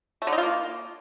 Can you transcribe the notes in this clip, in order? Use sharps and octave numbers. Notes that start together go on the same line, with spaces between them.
A3
D3
D#4
F4
A#3